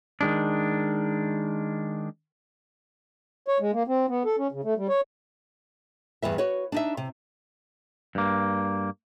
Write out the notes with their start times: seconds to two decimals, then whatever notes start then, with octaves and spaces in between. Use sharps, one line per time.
0.21 D#3 G#3 D4
3.48 C#5
3.60 G#3
3.73 A#3
3.87 C4
4.09 B3
4.25 A4
4.38 C#4
4.52 C#3
4.64 A3
4.77 G3
4.89 C#5
6.22 E2 G2 B4 E5
6.38 F#4 B4 C#5
6.72 D4 D#4 E5
6.97 C3
8.15 G2 A#3